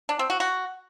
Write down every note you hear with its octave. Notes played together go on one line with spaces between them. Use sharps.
D4
C4
F#4
F#4